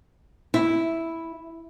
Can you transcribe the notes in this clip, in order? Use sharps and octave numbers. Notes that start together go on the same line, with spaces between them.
E4